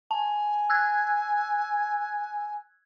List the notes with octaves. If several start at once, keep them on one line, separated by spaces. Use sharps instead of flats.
G#5 A5
E6 F#6 G#6